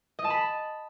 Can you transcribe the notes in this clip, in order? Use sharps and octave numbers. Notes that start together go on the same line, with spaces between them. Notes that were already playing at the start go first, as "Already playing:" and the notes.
D#5
A5
B5